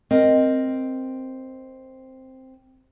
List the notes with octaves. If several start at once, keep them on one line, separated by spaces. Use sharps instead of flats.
C4 A#4 D#5